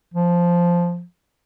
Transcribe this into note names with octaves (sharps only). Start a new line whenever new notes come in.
F3